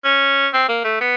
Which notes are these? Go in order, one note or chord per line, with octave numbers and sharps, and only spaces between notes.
C#4
C4
A#3
A3
B3